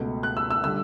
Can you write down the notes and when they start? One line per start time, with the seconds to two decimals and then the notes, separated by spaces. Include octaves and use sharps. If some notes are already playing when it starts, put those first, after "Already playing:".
Already playing: C#2 B2 A3
0.23 F#6
0.37 E6
0.50 E6
0.64 D3 G3 E6